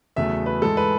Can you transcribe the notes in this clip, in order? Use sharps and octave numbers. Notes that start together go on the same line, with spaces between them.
E2 C#3 F#3 A3 E5
B4
G#2 E3 G#3 A4
B4